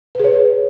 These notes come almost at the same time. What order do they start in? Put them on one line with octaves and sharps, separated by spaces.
B4 G#4 C#5